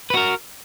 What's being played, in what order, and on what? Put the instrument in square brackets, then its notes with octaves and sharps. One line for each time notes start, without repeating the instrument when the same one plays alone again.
[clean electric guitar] B4
F#4
A#4